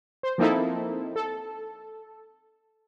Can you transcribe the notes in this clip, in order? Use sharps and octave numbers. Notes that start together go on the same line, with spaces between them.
C5
F3 A#3 C4 D#4 E4 A4
A4